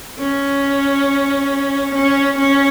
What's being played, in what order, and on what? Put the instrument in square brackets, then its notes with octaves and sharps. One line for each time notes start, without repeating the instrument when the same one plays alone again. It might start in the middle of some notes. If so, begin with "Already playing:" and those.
[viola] C#4
C#4
C#4